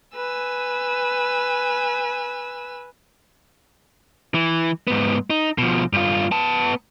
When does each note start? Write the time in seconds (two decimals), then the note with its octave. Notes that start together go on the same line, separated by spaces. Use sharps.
0.16 B4 G#5 E6
4.34 E3
4.87 G#2 B3
5.30 D#4
5.58 B2 F3
5.93 G2 F4
6.32 B3 A5